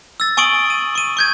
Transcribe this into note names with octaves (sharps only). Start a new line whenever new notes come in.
E6 A6
G#5 C#6 D#6 D7 F#7 G7
D#7
C#6 D#7
C#6 G6 G#6